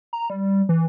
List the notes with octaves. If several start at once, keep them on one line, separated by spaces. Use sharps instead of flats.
A#5
G3
E3